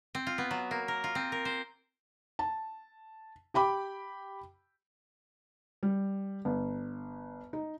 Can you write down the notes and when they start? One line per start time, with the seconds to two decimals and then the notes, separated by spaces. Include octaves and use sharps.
0.15 C4
0.27 F4
0.38 B3
0.51 F#3
0.71 A#3
0.88 A#4
1.04 F4
1.15 C4
1.32 A#4
1.45 C5
2.39 A5
3.54 G4 G5 B5 D6
5.83 G3
6.45 G1
7.53 D#4